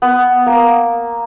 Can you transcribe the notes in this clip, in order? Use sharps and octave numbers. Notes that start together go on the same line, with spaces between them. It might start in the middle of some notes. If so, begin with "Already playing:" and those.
B3
A#3